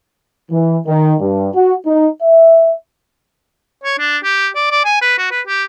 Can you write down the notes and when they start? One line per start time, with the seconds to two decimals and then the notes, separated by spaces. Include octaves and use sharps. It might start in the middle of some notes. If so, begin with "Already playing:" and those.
0.51 E3
0.87 D#3
1.20 G2
1.54 F#4
1.86 D#4
2.22 E5
3.84 C#5
3.99 D4
4.24 G4
4.55 D5
4.71 D5
4.85 G#5
5.02 B4
5.18 F#4
5.31 B4
5.47 G4